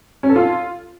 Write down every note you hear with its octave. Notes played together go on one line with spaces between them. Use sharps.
C#4
A4
F4